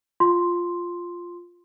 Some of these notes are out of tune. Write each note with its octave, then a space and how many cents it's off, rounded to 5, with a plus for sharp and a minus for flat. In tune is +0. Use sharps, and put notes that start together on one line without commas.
F4 +0 C6 +0